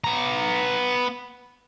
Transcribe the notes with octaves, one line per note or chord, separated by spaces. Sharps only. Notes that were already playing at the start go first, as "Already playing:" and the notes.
B3 A#5